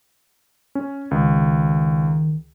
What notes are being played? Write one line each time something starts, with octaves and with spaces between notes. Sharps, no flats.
C#4
C#2 D#3